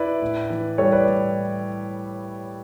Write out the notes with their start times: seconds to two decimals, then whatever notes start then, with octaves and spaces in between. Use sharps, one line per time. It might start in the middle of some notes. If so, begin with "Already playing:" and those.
Already playing: E4 B4 D5
0.22 A2
0.50 E3
0.78 G3 A4 C#5
0.92 B4 D5
1.07 A2